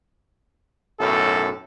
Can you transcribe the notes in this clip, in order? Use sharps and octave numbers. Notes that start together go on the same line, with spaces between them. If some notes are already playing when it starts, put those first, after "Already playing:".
B1 F#2 A2 A4